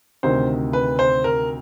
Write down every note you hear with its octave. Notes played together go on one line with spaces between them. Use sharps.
D2 C3 D#3 C5
B4
C5
A#4